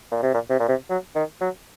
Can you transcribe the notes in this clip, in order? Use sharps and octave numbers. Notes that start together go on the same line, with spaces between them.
A#2
C3
A#2
C3
A#2
C3
F#3
D#3
F#3